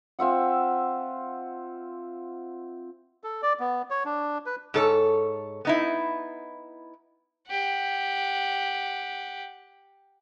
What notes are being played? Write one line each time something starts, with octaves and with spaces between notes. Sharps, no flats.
C4 F4 E5 F#5
A4
D5
B3
C#5
D4
B4
G#2 A4 C#5
B3 D#4 E4
G4 F#5